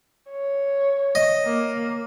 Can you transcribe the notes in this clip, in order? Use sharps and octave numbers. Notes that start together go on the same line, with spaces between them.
C#5
D#5
A#3